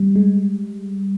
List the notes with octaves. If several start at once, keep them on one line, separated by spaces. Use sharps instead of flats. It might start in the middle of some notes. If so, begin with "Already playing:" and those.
Already playing: G3
G#3